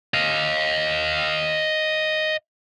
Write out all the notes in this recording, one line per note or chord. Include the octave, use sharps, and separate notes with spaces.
D#5 F5